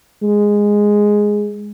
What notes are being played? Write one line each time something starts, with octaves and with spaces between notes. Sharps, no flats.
G#3